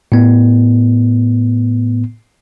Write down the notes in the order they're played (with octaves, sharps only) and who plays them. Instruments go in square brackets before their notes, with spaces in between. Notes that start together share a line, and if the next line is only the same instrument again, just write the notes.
[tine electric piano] A2 B3